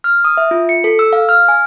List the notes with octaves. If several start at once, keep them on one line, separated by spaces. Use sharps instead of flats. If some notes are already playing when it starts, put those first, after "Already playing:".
F6
D#6
E5
F4
C#7
A4
E6
F5
F6
G#5